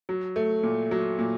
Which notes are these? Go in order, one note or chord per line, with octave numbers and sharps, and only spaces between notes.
F#3
A3
A#2
F#3
A#2